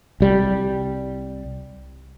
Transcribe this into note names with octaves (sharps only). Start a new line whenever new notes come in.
C2 G3